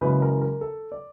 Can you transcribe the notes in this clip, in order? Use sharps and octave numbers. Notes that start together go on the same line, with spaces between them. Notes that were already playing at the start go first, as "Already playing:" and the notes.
F#1 F#2 C#3 E3 G#3 B4
A#4
A#4
A4
D5